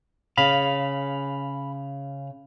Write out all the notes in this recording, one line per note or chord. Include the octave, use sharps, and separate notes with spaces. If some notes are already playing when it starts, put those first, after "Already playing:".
C#3 G#4 F5 B5